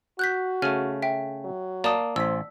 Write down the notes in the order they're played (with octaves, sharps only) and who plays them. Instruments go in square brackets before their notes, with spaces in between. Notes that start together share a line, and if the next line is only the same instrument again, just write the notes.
[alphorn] F#4 [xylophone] F#6 G6 B6
[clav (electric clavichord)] C#3 A3 [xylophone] F6 D#7
[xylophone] E5 G5
[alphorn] F#3
[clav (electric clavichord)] A#3 [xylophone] D5 A5 D#6
[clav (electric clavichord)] A1 [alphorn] C5 [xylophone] E6 B6